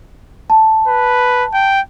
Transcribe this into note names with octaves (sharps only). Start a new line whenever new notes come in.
A5
B4
G5